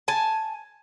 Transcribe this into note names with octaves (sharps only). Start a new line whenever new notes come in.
G#5 A5